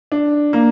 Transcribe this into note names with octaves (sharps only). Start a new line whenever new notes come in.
D4
A#3